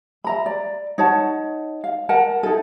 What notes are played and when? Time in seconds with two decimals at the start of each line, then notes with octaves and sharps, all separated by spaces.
0.24 E5 A#5 B5
0.46 D5
0.98 D#4 C#5 F#5 A5
1.84 F5
2.09 A#4 F#5 A5
2.43 D#4 E4 A4